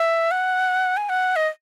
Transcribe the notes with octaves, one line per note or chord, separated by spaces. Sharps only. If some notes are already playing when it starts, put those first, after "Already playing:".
Already playing: E5
F#5
G#5
F#5
D#5